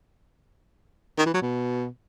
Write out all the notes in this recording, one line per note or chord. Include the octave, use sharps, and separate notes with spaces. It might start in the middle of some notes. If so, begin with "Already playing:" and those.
D#3
E3
F#3
B2